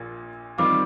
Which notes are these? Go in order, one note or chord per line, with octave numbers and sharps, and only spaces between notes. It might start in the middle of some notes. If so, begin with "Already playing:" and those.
Already playing: A#1 A#2
D#3 G3 C4 F4 D6